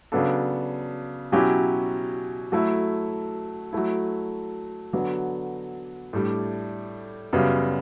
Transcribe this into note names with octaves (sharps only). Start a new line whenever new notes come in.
C#3 F#3 B3 D4 A4
B2 F#3 C#4 E4 G4
F#3 A3 E4
F#3 A3 E4
D3 F#3 B3
A2 G3 D4
F#2 C#3 G3 B3